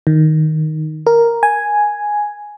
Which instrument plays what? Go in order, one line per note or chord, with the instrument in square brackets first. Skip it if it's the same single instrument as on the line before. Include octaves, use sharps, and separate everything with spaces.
[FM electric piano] D#3
A#4
G#5